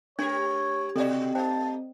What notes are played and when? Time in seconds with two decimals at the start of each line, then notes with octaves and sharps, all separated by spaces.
0.19 G#3 D4 G4 A#4 C#5 G#6
0.96 B2 C4 F#4 G4 A4 D5 D#5
1.35 A3 D#4 C5 G5 A5